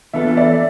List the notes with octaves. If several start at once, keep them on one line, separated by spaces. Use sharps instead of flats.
E3 B3 D4 F4 A4 E5
D5